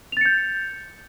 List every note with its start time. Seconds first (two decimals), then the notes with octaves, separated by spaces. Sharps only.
0.12 F7
0.17 A6
0.21 C#7
0.25 G6